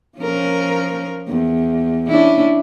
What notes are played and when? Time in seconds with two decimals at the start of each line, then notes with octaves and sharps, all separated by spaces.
0.18 F3 C#4 A#4
1.28 E2
2.09 C#4 D4 E4